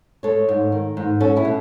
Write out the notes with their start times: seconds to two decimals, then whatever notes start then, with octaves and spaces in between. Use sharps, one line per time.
0.23 G#3 A4 C#5
0.48 G#2
0.72 D#3
0.97 G#2
1.20 C#4 F#4 A4
1.36 E4 G#4
1.45 B2